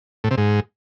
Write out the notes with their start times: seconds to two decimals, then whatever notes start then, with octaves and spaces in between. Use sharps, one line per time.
0.24 A2
0.31 C3
0.38 G#2